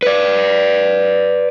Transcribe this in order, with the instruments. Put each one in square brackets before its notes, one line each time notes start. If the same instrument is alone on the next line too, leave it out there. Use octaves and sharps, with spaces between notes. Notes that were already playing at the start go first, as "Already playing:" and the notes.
[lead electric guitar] B4 D5